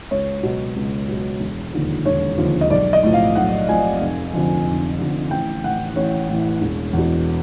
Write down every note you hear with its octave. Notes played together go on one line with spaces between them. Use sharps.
C#2 C#5
B2 F#3
C#2
B2 F#3
E1
D#2 D3 F3
E1 C#5
D#2 D3 F3
D#5
B1 D5
D#5
A2 F3
F5
B1 F#5
A2 F3 G#5
F1
F2 D3 F3
F1
F2 D3 F3
A1 G5
A2 E3 F#5
A1 C#5
A2
E3
E1
E2 B2